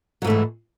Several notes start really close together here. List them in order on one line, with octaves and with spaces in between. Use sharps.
F#3 G#2 A3 E3